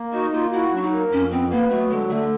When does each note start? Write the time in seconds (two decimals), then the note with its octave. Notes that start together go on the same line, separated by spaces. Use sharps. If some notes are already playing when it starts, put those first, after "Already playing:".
Already playing: A#3
0.13 D#4 F#4
0.32 A#3 F4
0.52 E4 F#4
0.72 F#3 D4
0.82 D#4
0.92 A#3
1.11 F2 C#4
1.31 B3 C4
1.50 A#3 B3
1.70 F#3 A3
1.90 D3 G#3
2.09 D3 A3